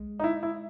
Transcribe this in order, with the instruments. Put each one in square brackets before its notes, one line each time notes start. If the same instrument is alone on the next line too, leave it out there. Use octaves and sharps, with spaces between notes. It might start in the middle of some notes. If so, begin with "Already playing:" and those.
Already playing: [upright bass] G#3
[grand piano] D#4
E4
E4